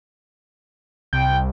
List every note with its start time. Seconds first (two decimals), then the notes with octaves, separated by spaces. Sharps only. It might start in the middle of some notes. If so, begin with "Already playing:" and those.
1.13 C2 G5